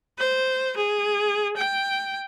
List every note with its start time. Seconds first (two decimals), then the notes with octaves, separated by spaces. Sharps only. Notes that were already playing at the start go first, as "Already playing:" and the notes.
0.18 C5
0.77 G#4
1.57 G5